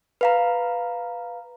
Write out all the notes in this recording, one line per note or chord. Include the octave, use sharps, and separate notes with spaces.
B4 F5 A#5